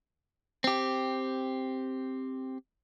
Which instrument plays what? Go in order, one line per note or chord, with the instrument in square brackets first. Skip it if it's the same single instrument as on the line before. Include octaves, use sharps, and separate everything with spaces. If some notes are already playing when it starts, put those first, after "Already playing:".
[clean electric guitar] C4 G4